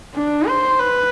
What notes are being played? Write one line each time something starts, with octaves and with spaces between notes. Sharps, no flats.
D4
C5
B4